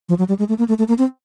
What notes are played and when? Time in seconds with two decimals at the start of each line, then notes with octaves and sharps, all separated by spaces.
0.09 F3
0.18 F#3
0.28 G3
0.39 G#3
0.49 A3
0.58 A#3
0.68 A3
0.78 A3
0.88 A#3
0.98 C4